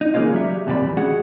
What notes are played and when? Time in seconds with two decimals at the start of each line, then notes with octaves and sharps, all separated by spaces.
0.01 D#4
0.14 C#3 E3 G#3 A#3 C#4 F4
0.32 F#3 G3 E5
0.67 D#2 C3 G3 G4 D5 B5
0.83 E2
0.97 G#3 C#4 F#4 G#4 F#5